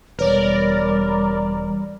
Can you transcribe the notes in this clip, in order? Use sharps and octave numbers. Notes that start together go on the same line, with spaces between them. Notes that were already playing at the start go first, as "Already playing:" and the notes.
E1 G3 A#4 B4 C#5 D5